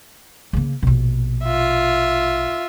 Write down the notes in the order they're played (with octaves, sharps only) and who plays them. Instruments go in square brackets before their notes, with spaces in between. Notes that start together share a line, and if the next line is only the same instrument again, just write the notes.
[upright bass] C#3 A#3
A#1 B2
[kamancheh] F4 E5